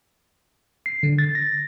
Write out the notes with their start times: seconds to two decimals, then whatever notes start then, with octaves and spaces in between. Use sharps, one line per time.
0.86 C7
1.03 D3
1.18 A6
1.35 A#6